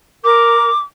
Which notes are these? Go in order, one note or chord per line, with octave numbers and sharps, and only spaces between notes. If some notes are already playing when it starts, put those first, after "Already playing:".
A#4 D6